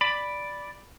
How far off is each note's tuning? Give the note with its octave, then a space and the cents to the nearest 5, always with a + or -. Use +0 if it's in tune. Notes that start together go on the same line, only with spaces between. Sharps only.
D5 +0 B5 +0